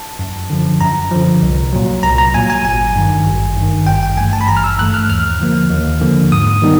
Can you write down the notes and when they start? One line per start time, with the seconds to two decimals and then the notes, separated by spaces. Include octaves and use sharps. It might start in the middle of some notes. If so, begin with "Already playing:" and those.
Already playing: A5
0.19 F#2
0.50 D3 F3
0.81 F#2 A#5
1.11 D3 F3
1.43 C2
1.73 A#2 F#3
2.03 C2 A#5
2.18 A#5
2.34 A#2 F#3 G#5
2.50 G#5
2.65 G#1 G#5
2.95 G2 D#3
3.26 G#1
3.57 G2 D#3
3.87 G#1 G5
4.03 G5
4.17 G2 E3 A3 G#5
4.33 A5
4.41 B5
4.48 G#1 A#5
4.57 F6
4.64 E6
4.78 G2 E3 A3 F#6
4.94 F6
5.09 D#2 F6
5.39 D3 F3 A#3
5.71 D#2
6.01 D3 F3 A#3
6.32 G#2 D#6
6.62 D#3 G3 B3 D#4